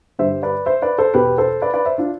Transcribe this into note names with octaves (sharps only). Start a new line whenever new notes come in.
G2 D3 G3 C5 E5
B4 D5
C5 E5
B4 D5
A4 C5
E2 B2 B3 G4 B4
A4 C5
B4 D5
B4 D5
C5 E5
D4 F4